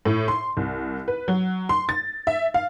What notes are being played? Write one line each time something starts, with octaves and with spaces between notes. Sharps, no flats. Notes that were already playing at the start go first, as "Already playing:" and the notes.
A2
C6
C2
B4
F#3
C6
A6
E5
F5